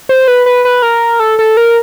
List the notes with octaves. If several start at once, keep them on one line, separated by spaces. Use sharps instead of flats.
C5
B4
B4
B4
A#4
A4
A4
A#4